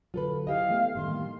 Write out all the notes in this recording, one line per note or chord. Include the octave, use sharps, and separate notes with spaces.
D3 F#3 F4 A4 B4
E4 G4 D#5 F5
E3 A3 B3
A2 D#3 G3 C6
A#3